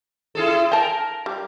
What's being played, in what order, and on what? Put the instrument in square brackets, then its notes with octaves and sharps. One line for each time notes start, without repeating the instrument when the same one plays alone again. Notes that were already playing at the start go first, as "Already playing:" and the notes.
[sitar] E4 G#4 A4
E4
[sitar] A#4 [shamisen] G5 A5
[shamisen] G3